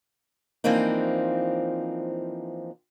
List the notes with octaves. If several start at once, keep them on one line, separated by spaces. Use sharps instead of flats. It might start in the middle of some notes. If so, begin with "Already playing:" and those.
E3 F3 A#3 C4 D4 D#4